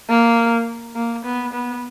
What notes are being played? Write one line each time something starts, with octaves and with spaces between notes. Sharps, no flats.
A#3
A#3
B3
B3